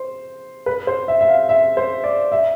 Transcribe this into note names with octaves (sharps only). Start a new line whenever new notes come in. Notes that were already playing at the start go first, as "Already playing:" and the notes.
Already playing: C5
B4
C5
E5
E5
F5
E5
C5
D5
E5